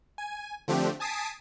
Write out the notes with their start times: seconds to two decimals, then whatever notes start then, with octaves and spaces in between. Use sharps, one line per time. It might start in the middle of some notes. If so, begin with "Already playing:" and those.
0.18 G#5
0.68 D3 F3 A3 C4 D4 G4
1.00 G#5 A5 D#6 B6 C7 D7